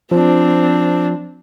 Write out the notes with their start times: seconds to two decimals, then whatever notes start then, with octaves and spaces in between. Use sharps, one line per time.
0.11 F3 C4 D4